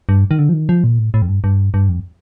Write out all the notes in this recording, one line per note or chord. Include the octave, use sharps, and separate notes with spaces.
G2
D#3
D3
F3
D#3
F3
A#2
A2
A2
F2
G2
G2
G2
F2